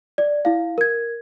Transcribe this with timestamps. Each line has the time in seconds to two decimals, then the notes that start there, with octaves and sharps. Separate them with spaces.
0.18 D5
0.45 E4 F5
0.78 A#4 G#6